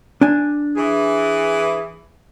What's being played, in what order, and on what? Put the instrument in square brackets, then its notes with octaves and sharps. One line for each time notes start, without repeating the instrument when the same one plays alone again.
[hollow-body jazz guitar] D4 G#5
[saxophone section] E3 G#4